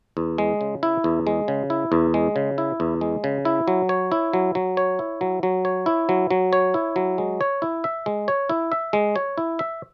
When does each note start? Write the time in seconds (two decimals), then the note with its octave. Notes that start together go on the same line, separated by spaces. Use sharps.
0.17 E2
0.38 G#3
0.61 C#3
0.83 E4
1.04 E2
1.27 G#3
1.48 C#3
1.70 E4
1.92 E2
2.14 G#3
2.36 C#3
2.58 E4
2.80 E2
3.01 G#3
3.24 C#3
3.45 E4
3.68 F#3
3.89 C#5
4.12 E4
4.33 F#3
4.55 F#3
4.77 C#5
4.99 E4
5.21 F#3
5.43 F#3
5.65 C#5
5.86 E4
6.09 F#3
6.31 F#3
6.53 C#5
6.74 E4
6.96 F#3
7.18 G#3
7.41 C#5
7.62 E4
7.84 E5
8.06 G#3
8.28 C#5
8.49 E4
8.72 E5
8.93 G#3
9.16 C#5
9.38 E4
9.59 E5